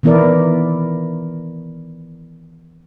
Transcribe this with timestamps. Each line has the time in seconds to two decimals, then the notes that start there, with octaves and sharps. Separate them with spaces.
0.03 D#3 E3 B3 E4 A#4 D5